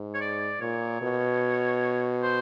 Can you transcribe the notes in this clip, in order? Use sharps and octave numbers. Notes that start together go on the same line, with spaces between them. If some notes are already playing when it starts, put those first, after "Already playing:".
Already playing: G#2
C#5
D5
A#2 C#5
B2
C5